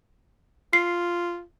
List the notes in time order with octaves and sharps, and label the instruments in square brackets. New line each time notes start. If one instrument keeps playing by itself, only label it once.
[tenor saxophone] F4 [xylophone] C7